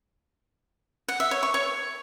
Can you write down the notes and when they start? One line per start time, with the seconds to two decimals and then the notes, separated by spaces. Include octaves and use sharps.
1.08 F#5
1.20 E5
1.31 C#5
1.43 C#6
1.54 C#5